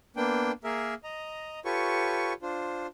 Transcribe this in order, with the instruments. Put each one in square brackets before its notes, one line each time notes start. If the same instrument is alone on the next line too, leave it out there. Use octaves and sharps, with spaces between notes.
[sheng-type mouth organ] A#3 B3 D4 G5
A#3 G#4 A#4 E5
D#5 A#5
F4 G4 A4 B4 C#5 C#6
D4 F4 C5